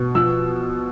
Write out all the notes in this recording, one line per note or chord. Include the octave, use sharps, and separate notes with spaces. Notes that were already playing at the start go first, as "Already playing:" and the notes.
Already playing: B2
F3 E6